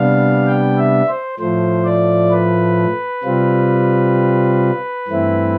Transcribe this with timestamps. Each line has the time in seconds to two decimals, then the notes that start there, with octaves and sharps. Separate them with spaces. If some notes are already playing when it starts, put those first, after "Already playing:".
Already playing: C3 G3 B3 D4 F5
0.47 G5
0.78 E5
1.08 C5
1.39 A2 F3 A3 C5
1.85 D5
2.31 B4
3.23 C3 G3 C4 F4
5.08 G2 E3 A3 C4 E4